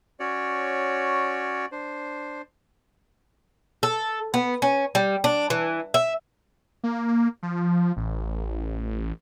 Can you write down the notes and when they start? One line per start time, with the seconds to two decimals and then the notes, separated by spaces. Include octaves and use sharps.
0.20 C#4 F#4 C#5 D5
1.72 D4 C5
3.83 A4
4.34 B3
4.62 C#4
4.95 G3
5.24 D4
5.50 E3
5.94 E5
6.84 A#3
7.43 F3
7.97 A1